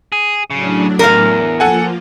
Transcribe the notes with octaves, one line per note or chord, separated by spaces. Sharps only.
G#4
A2 C#3 F#3 D4
E2 A#4 F5
F3 A#3 F4 A4 F#5 G#5